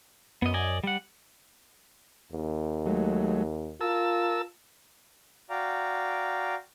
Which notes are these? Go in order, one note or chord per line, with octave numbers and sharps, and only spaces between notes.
F#2 B3 D#5
D5 D#5 G#5
G3 F#5
D#2
F#3 G#3 A3
F4 A#4 A5 E6
F#4 D5 F5 G5 A#5